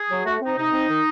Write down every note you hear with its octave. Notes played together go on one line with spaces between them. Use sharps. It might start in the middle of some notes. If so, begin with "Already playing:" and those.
Already playing: G#4
F#3
A3 F#4
C4
D#4
C3 D#4
C4
D#3